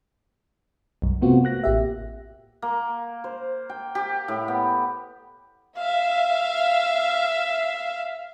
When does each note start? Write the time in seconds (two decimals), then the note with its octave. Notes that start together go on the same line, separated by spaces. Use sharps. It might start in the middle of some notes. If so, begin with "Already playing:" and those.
1.02 B1 F#2
1.21 C3 A3 B3 C4 F4 F#4
1.44 A#3 F#6 A#6
1.64 A1 G4 E5
2.62 A#3
3.24 C5
3.70 G5
3.95 G4
4.28 A2
4.48 B3
5.76 E5 F5